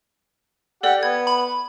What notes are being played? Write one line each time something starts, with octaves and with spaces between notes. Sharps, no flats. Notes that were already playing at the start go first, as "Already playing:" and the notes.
G4 A4 D5 F#5 F#7
B3 G#6
B5